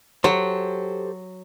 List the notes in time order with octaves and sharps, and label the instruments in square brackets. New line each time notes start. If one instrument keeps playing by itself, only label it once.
[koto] F#3 [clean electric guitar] G4 A4 C5